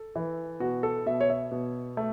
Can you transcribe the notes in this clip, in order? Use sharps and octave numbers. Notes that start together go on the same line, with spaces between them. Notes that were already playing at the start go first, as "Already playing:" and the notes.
Already playing: A4
E3
B2 F#4
A4
B2 E5
C#5
E5
B2
A3